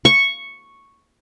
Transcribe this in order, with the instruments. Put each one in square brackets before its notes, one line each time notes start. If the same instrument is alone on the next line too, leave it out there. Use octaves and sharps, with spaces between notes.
[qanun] C#6